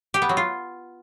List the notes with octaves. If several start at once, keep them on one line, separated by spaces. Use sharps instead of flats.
G4
B3
F#3
F4